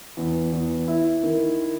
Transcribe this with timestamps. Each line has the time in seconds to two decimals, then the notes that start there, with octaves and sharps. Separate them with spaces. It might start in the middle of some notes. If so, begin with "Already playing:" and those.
0.17 E2
0.53 E2
0.88 E4
1.23 D#3